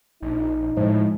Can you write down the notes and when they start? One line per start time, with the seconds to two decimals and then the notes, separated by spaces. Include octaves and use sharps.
0.22 A#1 D#4
0.77 A2 F3 G#3